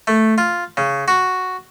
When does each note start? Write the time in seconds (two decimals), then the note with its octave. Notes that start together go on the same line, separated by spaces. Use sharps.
0.07 A3
0.38 F4
0.77 C#3
1.08 F#4